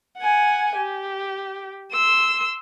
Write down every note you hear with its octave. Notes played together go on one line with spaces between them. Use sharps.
F#5 G#5
G4
C6 E6